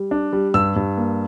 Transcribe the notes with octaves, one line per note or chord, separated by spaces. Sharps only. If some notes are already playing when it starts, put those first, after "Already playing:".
Already playing: G3
D4
G3
G2 E6
G2
A#3